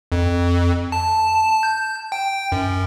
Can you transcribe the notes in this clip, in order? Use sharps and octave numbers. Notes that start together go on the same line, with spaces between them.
F2
A5
G6
G5
F#2